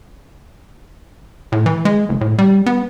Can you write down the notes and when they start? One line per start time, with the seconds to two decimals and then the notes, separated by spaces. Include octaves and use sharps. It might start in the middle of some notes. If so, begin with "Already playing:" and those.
1.52 A2
1.66 E3
1.85 G#3
2.09 F#1
2.21 A2
2.38 G3
2.66 B3